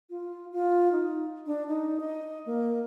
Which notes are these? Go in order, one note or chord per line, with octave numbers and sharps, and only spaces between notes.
F4
F4
D#4
D4
D#4
D#5
A#3